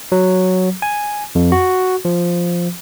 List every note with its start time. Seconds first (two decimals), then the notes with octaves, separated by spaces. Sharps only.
0.12 F#3
0.82 G#5
1.35 F2
1.52 F#4
2.05 F3